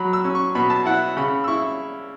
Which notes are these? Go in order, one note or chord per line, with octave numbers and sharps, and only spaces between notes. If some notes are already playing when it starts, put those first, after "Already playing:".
Already playing: F#3 B5
E6
C#4
C#6
B2 B5
A5
E4 F#5
C#3 B5
E6
E4 C#6